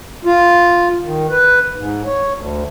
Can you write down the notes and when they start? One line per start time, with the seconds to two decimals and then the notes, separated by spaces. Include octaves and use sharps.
0.25 F4
1.03 D#3
1.30 B4
1.76 G#2
2.06 C#5
2.34 D2